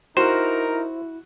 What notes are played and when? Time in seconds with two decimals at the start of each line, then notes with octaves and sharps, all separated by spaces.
0.17 D#4 E4 F#4 A#4 C5